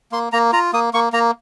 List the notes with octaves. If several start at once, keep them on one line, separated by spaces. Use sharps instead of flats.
A#3 C6
A#3 A#5
F4 A#5
A#3 D#6
A#3 C#6
A#3 A#5